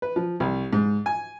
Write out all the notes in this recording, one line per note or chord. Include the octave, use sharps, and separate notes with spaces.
B4
F3
C2
G#2
G#5